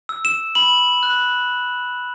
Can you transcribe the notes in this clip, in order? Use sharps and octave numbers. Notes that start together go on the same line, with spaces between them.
E6
E7
B5 F#7
F#6